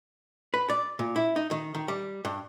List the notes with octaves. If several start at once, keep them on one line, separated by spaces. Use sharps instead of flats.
B4
D5
A#2
E4
D#4
D#3
D#3
G3
G2